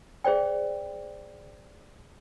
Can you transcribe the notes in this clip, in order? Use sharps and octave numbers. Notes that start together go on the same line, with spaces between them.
G#4 C5 D5 G5